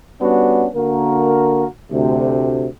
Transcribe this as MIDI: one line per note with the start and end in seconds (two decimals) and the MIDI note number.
0.20 0.66 55
0.20 0.66 59
0.20 0.66 61
0.20 0.66 62
0.20 0.66 66
0.75 1.65 50
0.75 1.65 58
0.75 1.65 66
0.75 1.65 70
1.91 2.65 38
1.91 2.65 48